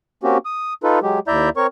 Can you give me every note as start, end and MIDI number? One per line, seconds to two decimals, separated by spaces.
0.23 0.38 58
0.23 0.38 60
0.23 0.38 61
0.23 0.38 66
0.23 0.38 67
0.45 0.74 87
0.83 0.99 63
0.83 0.99 65
0.83 0.99 69
0.83 0.99 71
1.02 1.19 54
1.02 1.19 56
1.02 1.19 67
1.28 1.49 39
1.28 1.49 64
1.28 1.49 74
1.28 1.49 76
1.28 1.49 82
1.28 1.49 91
1.57 1.67 60
1.57 1.67 70
1.57 1.67 73
1.57 1.67 85